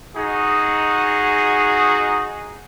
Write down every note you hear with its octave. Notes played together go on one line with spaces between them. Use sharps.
D#4 F#4 G#4